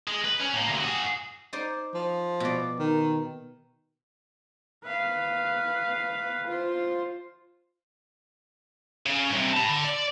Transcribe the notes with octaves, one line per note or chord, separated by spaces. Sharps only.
G#3
B4
C#4
A2 A#3
D2 C3
F#4 G#4
D#4 C5 D5
F3
B2 D5
D#3
B4 F5
F4 C5
C#3
G2 C3
A5 B5
D3
D5